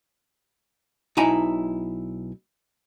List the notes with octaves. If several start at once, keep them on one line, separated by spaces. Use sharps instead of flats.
B1 D#4 E4 G#5 A#5